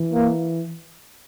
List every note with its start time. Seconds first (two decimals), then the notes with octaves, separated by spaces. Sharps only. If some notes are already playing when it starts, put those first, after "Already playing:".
Already playing: E3
0.13 A#3